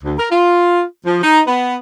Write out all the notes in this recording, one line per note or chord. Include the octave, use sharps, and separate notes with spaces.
D2
A#4
F4
F3
D#4
B3